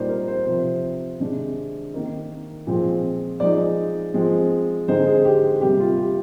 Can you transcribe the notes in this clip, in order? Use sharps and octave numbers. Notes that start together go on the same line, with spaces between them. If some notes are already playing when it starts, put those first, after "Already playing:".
Already playing: A#2 G3 A#3 D#4 C5 D5
A#4
C5
C3 F3 C4 C5
C3 D#3 G#3 D4
D#3 A#3 D#4
A#2 F3 G#3 C4
F3 G#3 D#4 D5
F3 G#3 C4
D3 G#3 C4 D#4 C5
G#4
G4
C3 G3 A#3 G4
F4
G4